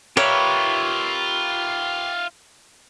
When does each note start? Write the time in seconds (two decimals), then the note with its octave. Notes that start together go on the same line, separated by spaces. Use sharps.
0.17 F4 G4 A#4 B4 C#5 E5